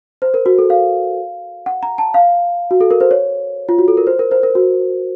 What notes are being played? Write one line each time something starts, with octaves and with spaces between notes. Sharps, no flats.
C5
A#4
F#4
A4
F5
F#5
A#5
A5
F5
F#4
A4
A#4
C5
C#5
F4
F#4
A4
A#4
C5
A#4
C5
A#4
F#4